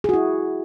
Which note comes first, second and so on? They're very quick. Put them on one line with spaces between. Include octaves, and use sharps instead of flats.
G#4 F#4 E4